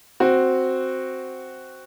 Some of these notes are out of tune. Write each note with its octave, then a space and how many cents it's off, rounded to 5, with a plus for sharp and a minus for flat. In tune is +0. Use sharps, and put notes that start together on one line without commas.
C4 +0 F#4 +0